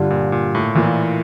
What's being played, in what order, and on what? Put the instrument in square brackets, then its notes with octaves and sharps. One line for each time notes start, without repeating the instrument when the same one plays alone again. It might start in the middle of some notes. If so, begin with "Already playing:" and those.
Already playing: [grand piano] G2 D3 G3 D4 F4
[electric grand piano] A#2
A#2
A2
[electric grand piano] A#2 [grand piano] E3 A#3 F4 A#4 D5